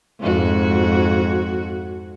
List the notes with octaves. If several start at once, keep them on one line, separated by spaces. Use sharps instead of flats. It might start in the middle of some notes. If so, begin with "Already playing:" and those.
F2 G#2 F#4